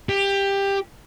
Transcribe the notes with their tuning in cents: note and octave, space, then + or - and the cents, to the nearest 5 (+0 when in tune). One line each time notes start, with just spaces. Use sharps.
G4 +15